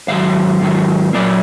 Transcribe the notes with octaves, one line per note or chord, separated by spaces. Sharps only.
G#2 D#3 F#3 F5
G#2 D#3 F#3
A#2 F#3 A#3 D5